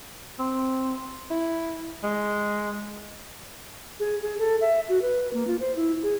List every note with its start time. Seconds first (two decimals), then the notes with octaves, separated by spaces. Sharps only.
0.39 C4
1.30 E4
2.03 G#3
4.00 G#4
4.22 G#4
4.38 A4
4.61 E5
4.89 F#4
5.02 B4
5.33 A#3
5.47 F4
5.60 C5
5.76 E4
6.02 G#4